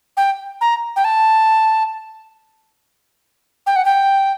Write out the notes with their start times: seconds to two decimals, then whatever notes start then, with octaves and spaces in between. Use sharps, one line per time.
0.17 G5
0.61 A#5
0.96 G5
1.04 A5
3.67 G5
3.76 F#5
3.85 G5